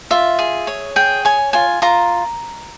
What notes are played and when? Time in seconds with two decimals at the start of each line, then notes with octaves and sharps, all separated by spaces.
0.11 F4 E5
0.39 G#4
0.67 C#5
0.96 G#4 G5
1.25 C#5 G#5
1.53 F4 G#5
1.82 F4 A#5